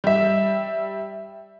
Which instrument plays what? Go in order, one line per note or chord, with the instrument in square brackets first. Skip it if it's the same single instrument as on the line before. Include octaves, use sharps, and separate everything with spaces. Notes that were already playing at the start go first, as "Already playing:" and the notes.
[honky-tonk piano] G3 E5